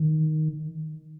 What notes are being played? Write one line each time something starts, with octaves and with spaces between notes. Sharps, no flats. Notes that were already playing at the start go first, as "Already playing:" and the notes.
Already playing: D#3